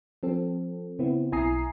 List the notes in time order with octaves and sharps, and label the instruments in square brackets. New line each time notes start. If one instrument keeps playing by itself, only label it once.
[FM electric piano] F3 C4 A4
C#3 B3 C4 E4
B1 E4 G#5 A#5 D#6 C7